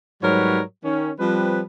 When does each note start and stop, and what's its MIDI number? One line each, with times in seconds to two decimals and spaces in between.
0.23 0.61 44
0.23 0.61 54
0.23 0.61 55
0.23 0.61 70
0.23 0.61 71
0.23 0.61 73
0.84 1.11 51
0.84 1.11 61
1.20 1.62 53
1.20 1.62 55
1.20 1.62 60
1.20 1.62 71